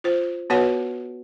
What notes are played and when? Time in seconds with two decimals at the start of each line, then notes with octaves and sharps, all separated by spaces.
0.04 F4 C5
0.50 B3 F#4 B4 C#5 F#5